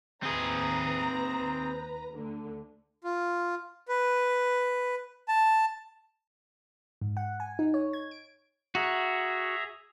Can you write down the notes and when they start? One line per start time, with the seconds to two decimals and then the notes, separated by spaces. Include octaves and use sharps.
0.23 D#2 C4 G#4 B4 A#5
2.12 D2 D3
3.04 F4
3.88 B4
5.28 A5
7.01 G#2
7.17 F#5
7.40 G#5
7.59 D#4
7.74 C#5
7.93 G#6
8.11 D7
8.75 F#4 G#4 E5 A#5